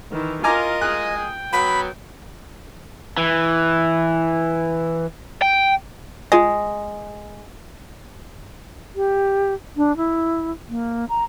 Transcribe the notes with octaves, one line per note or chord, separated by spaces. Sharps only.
D#3 E3
F4 A#4 D#5 G#5 A#5 D6
G#3 G#5 D#6 F#6
G5
F#3 B3 B5
E3
G5
G#3 F4 G#4 A#6
G4
D4
E4
A#3
A#5